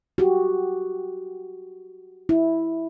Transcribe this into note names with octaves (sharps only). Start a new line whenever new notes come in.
F#4 G4
E4